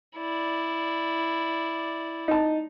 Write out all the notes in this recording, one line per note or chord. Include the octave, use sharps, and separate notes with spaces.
E4 D5
D#4 A5